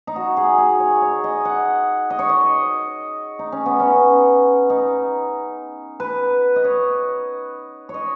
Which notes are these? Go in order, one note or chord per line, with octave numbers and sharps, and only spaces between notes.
D#4
F#4
G#4
G#4
C#5
C#5
D#5
F#5
D#5
C#5
D#5
D#4
C#4
B3
C#4
D#4
B4
D#5
C#5
C#5
D#5